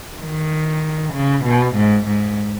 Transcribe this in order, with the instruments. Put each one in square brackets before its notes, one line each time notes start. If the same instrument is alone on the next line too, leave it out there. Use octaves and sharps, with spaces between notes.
[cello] D#3
C#3
B2
G#2
G#2